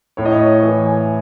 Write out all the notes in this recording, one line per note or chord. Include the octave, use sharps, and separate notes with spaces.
A2 C#5
D#5
C#5
E3
G#5